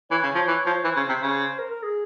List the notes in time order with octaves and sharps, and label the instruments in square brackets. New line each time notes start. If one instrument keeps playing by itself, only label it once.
[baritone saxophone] E3 [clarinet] C#5
[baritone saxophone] C#3
F3
E3
F3
[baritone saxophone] E3 [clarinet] C5
[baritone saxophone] C#3
C3
C#3
[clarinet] A#4
A#4
G#4